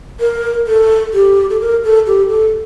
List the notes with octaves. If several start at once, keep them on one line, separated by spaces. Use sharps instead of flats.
A#4
A4
G4
A4
A#4
A4
G4
A4